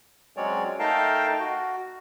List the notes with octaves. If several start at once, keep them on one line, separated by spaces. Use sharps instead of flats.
F#3 G#3 C4 C#4 C#5 D5
A3 D#4 A#4 F5 G5 A5
F#4